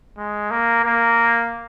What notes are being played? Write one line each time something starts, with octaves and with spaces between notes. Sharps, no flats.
G#3
A#3
A#3